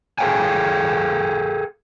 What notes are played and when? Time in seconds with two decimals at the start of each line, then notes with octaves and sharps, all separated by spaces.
0.19 G#4 A4 D5 F5 G5 G#5